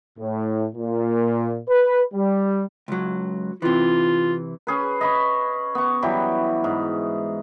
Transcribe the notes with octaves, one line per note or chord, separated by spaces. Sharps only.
A2
A#2
B4
G3
C#2 F#3
C3 E3 F4
C#4 G#4 B4
D#5 B5 C#6
B3 C#6
E3 F#3 G3 G4
G#2